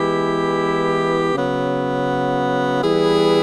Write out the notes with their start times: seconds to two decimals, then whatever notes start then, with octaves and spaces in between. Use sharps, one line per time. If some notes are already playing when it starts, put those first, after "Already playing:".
Already playing: E3 G#3 B3 E4 G4
1.32 C#3 F#3 B3
2.81 E3 G3 B3 E4 G#4